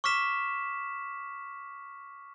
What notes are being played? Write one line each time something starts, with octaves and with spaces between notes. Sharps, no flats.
C#6 D6 F6 B6 E7